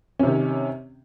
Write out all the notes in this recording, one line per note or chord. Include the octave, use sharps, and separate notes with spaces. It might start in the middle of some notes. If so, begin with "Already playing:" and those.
C3 D#3 C#4